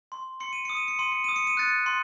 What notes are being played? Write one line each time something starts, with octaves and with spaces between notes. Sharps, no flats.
C6
C6 C#7
D#7
D#6 C#7
D#7
C#7
C6 D#7
C#7
D#6 D#7
C#7
D#7
F#6 A6 C#7
C6